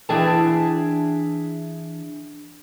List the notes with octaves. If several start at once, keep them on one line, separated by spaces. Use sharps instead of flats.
E3 D4 G#4 E5 G5 A5